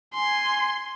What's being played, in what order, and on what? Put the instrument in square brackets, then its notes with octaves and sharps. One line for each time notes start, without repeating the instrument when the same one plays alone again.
[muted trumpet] G#5 [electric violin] C6